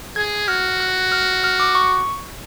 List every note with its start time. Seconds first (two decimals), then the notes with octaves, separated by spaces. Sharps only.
0.16 G#4 G#6
0.48 F#4 F6
0.80 F#6
1.12 F6
1.44 F6
1.60 D6
1.75 C#6